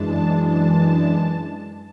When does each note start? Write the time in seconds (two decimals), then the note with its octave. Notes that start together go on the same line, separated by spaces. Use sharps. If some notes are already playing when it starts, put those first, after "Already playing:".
Already playing: F#2 E3 G#3 D4 A5
0.46 A5